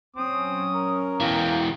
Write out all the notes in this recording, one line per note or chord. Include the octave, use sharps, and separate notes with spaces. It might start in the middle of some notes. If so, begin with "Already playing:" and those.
F#3 C4 C#4 D#6
A#4
B2 E3 F5 G5